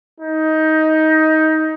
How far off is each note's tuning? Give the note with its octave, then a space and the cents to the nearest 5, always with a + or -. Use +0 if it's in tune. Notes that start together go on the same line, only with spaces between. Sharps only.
D#4 +15